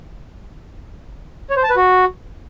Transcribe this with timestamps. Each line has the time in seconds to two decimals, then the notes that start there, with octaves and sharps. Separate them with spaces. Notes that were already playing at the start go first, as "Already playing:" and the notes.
1.50 C#5
1.57 C5
1.63 A5
1.70 B4
1.76 F#4